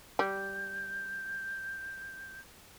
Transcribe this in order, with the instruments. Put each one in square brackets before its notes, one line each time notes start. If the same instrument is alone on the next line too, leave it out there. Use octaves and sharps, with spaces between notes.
[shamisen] G3 [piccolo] G6